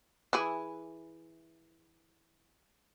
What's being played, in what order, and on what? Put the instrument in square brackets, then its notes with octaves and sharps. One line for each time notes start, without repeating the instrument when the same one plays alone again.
[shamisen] E3 E4 G#4